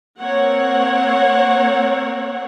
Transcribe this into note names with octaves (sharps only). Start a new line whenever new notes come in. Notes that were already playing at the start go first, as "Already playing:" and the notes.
A#3 C4 C#5 F#5